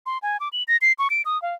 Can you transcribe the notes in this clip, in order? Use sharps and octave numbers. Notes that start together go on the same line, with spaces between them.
C6
G#5
D6
F#7
A#6
C7
C#6
D7
D#6
F5